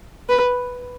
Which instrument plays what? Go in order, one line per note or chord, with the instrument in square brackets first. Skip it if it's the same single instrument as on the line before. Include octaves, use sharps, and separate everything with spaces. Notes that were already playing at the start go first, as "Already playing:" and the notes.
[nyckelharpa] B4